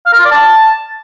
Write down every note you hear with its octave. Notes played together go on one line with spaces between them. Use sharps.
F5
A#4
F4
D5
A5